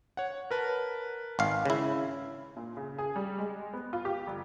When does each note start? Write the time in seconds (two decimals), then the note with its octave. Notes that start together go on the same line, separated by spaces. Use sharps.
0.17 C#5 F#5
0.51 A#4 B4 A5
1.39 G#1 F5
1.65 C#3 E4
2.57 A#2
2.77 C#3
2.98 G#4
3.16 G3
3.39 G#3
3.73 B3
3.93 F4
4.05 G4
4.27 G1